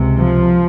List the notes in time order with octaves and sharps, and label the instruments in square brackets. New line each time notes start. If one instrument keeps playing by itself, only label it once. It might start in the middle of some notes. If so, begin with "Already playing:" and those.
Already playing: [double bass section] C#2 C3
F3